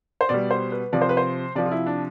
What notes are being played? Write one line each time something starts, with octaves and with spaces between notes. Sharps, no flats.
C5
B2 G3 D5
C5
B4
C3 F3 D5
C5
B4
C5
C3 F3 D5
F4
E4
D4